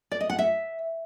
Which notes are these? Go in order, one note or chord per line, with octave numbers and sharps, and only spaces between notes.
D5
D#5
F#5
E5